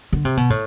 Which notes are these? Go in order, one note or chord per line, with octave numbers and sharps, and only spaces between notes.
D3
C3
B2
A2